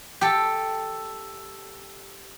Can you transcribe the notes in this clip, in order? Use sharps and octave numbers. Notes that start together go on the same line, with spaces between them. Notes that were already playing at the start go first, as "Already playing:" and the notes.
G4 A4